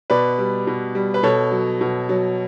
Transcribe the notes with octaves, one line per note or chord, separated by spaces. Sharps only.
B2 B4 D5
G3
B2
G3
B4
B2 A4 C#5
F#3
B2
F#3